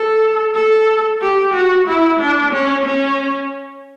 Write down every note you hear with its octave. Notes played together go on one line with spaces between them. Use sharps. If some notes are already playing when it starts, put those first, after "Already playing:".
Already playing: A4
A4
G4
F#4
E4
D4
C#4
C#4